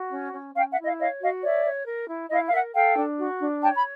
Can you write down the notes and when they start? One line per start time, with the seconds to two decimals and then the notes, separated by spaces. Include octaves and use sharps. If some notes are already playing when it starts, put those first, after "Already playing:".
Already playing: F#4
0.12 C#4
0.33 C#4
0.55 C#4 F5 G5
0.70 E5 F#5
0.77 E4
0.84 D#5 F5
0.99 C#5 D#5 F5
1.21 F#4 D#5 F5
1.42 C#5 D5 E5
1.65 C#5
1.87 A#4
2.09 E4
2.30 E4 D#5 F5
2.46 F5
2.51 A#4 E5 F#5
2.73 A4 F5 G5
2.96 D4
3.18 F#4
3.39 D4
3.61 C#5 G5 A5
3.76 B5